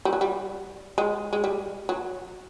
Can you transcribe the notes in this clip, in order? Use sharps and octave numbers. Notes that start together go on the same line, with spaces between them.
G3
F#3
G3
G#3
G#3
G3
F#3